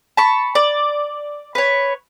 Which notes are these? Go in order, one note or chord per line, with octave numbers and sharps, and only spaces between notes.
A5 B5 C#6
D5
B4 C#5